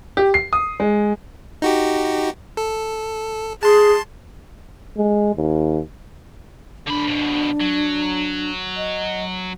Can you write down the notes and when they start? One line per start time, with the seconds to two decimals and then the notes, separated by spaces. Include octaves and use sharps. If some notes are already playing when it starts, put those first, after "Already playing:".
0.17 G4
0.34 C7
0.53 D#6
0.80 G#3
1.62 D#4 F#4 G4
2.57 A4
3.63 G#4 A5 C6
4.97 G#3
5.36 D#2
6.87 D3 D4 B5
7.07 F2 B2
7.61 F#3
8.77 D#5